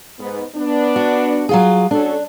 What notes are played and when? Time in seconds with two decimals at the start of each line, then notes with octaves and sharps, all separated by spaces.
0.19 G#2 B3
0.55 B3 D4
0.96 F#4
1.49 F#3 F4 G#4
1.91 C#4 D4 F#4 A4